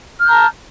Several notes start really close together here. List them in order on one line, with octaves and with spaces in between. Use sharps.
F6 G6 A#5 A5